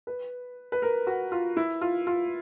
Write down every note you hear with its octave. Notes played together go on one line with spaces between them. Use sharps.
B4
B4
A#4
F#4
F4
E4
F4
F4